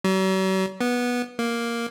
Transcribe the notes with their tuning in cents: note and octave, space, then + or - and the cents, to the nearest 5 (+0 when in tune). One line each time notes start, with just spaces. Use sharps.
F#3 +45
B3 -15
A#3 +5